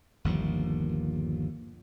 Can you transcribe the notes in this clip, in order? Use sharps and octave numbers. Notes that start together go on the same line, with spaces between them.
G1 D#2 A#2 F3